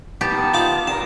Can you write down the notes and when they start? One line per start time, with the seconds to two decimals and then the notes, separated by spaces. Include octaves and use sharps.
0.21 B3 G4 A5
0.32 D#3
0.54 F4 D5 D6
0.87 E2 A#4 A5